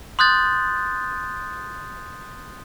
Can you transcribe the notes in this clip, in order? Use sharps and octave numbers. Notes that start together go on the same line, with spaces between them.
C6 D#6 F#6 G6 A6